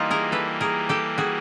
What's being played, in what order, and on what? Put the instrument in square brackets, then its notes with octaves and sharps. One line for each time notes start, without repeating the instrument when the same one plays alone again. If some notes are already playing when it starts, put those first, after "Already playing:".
Already playing: [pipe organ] E3 G3 A#3 [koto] D#4 F4
[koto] G#4 A#4
A4 B4
G#4 A#4
G4 A4
F#4 G#4